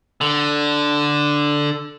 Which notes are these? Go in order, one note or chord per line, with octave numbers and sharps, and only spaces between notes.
D3